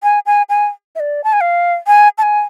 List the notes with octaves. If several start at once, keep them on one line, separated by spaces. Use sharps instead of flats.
G#5
G#5
G#5
E5
D5
A5
G#5
F5
G#5
A5
G#5